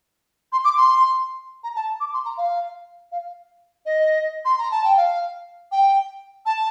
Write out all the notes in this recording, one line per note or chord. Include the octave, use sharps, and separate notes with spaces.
C6
D6
C6
A#5
A5
D6
C6
A#5
F5
F5
D#5
C6
A#5
A5
G5
F5
G5
A5